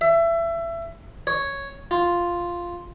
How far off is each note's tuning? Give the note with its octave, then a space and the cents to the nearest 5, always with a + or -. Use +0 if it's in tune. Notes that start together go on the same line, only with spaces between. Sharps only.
E5 +25
C#5 +0
F4 +0